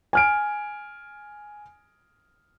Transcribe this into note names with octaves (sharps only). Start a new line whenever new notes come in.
G#5 F6 D7